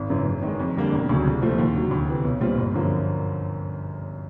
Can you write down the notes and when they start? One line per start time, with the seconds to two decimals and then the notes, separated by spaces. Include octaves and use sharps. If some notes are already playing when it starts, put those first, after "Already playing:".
Already playing: G#1
0.10 F#2 C#3 E3
0.26 F#2
0.42 D#3 G#3
0.59 F2
0.75 D3 G3 A#3 D4
0.92 E1
1.09 D2 C#3 F#3
1.25 C2
1.42 A#2 F3 A3 C4
1.58 D#2
1.74 D3 F#3
1.91 D2
2.08 C3 E3
2.25 B1
2.40 A#2 G3 C4 F4
2.58 G1
2.74 F#2 D3 F3 A#3